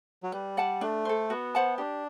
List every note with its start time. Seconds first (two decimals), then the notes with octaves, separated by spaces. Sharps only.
0.23 F#3
0.32 G3 B4
0.57 D5 F#5 A5
0.81 A3 D4
1.05 A4 C5
1.30 B3 F#4
1.55 C5 F#5 A5
1.78 D4 G4